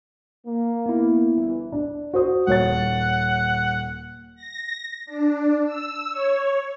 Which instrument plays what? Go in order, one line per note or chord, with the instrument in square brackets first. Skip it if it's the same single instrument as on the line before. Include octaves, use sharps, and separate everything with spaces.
[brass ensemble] A#3
[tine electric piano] B3 E4
[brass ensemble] G1 E3
[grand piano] D4
F#4 C5 D#6
[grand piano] D#1 C#5 A6 [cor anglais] F#5
[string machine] A#6
D4
E6
C#5